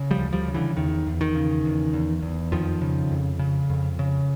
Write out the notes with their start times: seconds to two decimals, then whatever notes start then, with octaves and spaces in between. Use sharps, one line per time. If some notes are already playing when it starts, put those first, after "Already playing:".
Already playing: C#3
0.11 F3 G3
0.18 D2
0.33 F3 G3
0.48 C#3
0.54 D3 E3
0.77 E2 D#3
1.07 E2
1.21 D#3
1.36 C#3
1.65 E2
1.93 E2
2.22 E2
2.52 F2 D#3 F3
2.82 C#3
3.11 F2
3.39 C#3
3.70 F2
3.99 C#3